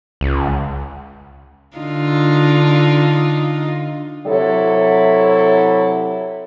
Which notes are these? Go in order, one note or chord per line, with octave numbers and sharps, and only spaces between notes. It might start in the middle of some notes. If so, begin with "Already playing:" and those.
C#2
D3 D#4 F4
C3 F#3 E4 A4 C#5